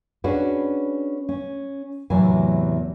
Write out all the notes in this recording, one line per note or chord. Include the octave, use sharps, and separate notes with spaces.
C#4 D4 F#4 G#4 B4
C#4
E2 A2 C3 E3 F#3 G#5